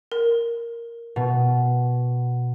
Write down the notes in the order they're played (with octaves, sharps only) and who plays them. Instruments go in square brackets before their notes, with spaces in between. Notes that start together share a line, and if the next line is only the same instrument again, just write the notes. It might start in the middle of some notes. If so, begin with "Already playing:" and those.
[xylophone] A#4
[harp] B2